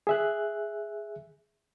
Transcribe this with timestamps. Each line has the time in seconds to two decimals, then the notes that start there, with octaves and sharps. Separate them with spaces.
0.07 G#4 E5 F#6